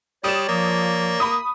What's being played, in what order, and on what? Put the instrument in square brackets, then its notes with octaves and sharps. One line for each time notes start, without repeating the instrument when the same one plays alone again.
[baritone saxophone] G3 [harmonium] C#5 D5 [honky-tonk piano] D#6 E7
[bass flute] F3 [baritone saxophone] A#3
[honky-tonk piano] B5 D#6